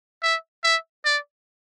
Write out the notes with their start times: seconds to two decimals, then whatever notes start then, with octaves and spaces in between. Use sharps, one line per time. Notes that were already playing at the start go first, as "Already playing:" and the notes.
0.23 E5
0.64 E5
1.05 D5